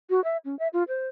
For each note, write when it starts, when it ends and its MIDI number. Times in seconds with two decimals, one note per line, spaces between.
0.10 0.23 66
0.24 0.37 76
0.45 0.58 61
0.59 0.68 76
0.73 0.83 65
0.88 1.08 72